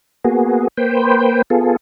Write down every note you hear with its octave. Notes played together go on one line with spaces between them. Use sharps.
A#3 B3 F#4 G#4
A#3 B4 C5 G5
B3 F4 G#4 A4